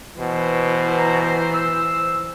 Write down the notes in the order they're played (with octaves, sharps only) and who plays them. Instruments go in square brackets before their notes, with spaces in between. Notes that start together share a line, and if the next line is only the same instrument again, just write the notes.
[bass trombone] B2 [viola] E3 C5
[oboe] A#5
E6